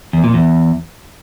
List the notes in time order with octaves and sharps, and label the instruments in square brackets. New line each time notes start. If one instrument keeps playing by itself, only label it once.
[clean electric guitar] E2
A#2
E2